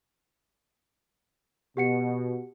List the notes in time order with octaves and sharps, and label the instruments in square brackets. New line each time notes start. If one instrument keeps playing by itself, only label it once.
[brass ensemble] B2 [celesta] G4 F#5 C#7